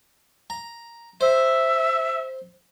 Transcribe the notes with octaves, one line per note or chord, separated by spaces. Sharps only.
A#5
C5 E5